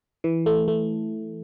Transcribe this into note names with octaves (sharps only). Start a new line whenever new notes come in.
E3
A3
A3